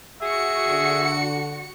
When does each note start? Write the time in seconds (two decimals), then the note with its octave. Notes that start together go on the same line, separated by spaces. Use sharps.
0.22 F#4 G#4 E5 C#7
0.66 D3